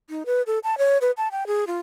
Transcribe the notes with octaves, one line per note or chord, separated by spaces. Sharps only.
D#4
B4
A4
A5
C#5
B4
A5
G5
G#4
F4